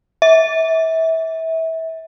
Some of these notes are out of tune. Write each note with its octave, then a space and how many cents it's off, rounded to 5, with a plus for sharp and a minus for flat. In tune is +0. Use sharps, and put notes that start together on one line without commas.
E5 -30